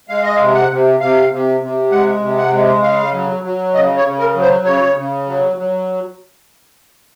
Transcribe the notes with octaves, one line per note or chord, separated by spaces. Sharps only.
G#3 F5
D#5
F5
C3
F#5
C3
C3 F5
C3
C3
G#3 F#5
C3
F#5
G#3
C#3 F5
F#3
F#3
C#3 D#5
C#5
C#3
A#4
F#3
C5
C#3 C#5
C#3
F#3
F#3